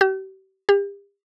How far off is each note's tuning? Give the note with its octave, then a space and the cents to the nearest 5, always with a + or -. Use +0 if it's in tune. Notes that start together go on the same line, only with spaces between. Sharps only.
G4 -40
G4 +35